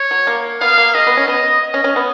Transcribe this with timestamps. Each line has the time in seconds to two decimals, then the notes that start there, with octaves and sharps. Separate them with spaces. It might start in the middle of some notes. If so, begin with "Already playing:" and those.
Already playing: C#5
0.11 F#3
0.27 A#3
0.61 B3 F5
0.78 A#3
0.95 G#3 D#5
1.07 B3
1.17 C#4
1.28 B3 D#5
1.63 D#5
1.74 C#4
1.84 C#4
1.96 B3